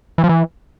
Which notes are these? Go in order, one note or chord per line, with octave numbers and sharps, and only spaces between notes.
E3
F3
E3